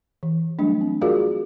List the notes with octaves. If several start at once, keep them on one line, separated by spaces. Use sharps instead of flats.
E3
F#3 G3 A3 D4
C4
F4 F#4 G#4 A#4 D5 F5